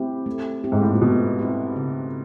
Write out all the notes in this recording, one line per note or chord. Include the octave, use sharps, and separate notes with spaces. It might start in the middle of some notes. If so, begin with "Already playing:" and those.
Already playing: A2 C4 E4 G4
A3
C4 E4 G4
G#2
A2
A#2
B2 A3
C4 E4 G4
C#3